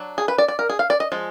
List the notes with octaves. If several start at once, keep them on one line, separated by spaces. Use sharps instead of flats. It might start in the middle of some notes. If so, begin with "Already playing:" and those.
Already playing: F#3 D4
G#4
B4
D5
D5
A#4
G#4
F5
D5
D#5
F3 G#3